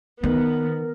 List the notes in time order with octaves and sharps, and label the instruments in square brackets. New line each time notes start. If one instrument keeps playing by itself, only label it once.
[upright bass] D#3 [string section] B3 [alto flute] A#4